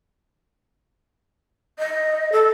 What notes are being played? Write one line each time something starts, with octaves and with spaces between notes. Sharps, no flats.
D#5
A4